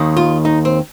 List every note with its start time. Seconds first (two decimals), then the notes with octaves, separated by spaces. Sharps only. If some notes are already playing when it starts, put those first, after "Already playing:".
Already playing: D#2 D#3
0.17 F4
0.45 D#4
0.65 C4